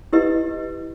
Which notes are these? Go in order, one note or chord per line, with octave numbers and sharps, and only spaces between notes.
E4 G4 B4 D#5